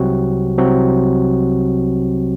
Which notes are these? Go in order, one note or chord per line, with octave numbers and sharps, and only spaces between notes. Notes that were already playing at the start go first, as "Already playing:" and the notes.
Already playing: C2 C3 F#3 C4 F#4
C2 C3 F#3 C4 F#4